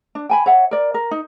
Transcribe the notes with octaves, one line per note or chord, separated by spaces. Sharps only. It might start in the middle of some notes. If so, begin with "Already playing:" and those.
D4
G5 G#5 B5
C#5 E5 F#5
A#4 D5
A#4
D#4